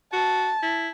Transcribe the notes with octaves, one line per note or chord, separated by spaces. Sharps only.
F#4 A5
E4